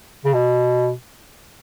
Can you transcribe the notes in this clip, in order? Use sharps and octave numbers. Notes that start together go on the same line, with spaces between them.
C#3
B2